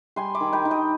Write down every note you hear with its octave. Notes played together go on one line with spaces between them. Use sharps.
G3 G#5 C6
B5 D6
D#3
G5 B5
D#3
D#5 G5